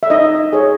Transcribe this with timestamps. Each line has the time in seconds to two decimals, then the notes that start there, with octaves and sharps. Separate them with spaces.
0.03 E5
0.10 D#4 D#5
0.53 G#4 C#5